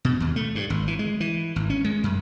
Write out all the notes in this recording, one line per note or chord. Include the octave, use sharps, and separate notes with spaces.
B2
D#2
A3
G2
G#1
E3
G#3
E3
G#1
C#4
G#3
F#2